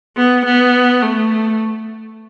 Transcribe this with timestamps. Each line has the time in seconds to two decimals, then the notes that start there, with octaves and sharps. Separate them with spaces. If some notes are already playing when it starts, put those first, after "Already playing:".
0.17 B3
0.45 B3
1.03 A3